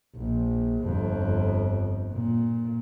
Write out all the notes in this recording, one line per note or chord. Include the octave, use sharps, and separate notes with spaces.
A#1
G1 F2
A#2